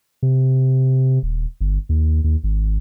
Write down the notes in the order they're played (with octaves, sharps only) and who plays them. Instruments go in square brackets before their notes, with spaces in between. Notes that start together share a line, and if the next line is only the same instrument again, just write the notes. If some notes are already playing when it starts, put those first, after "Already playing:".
[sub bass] C3
D#1
G1
D#2
D#2
G#1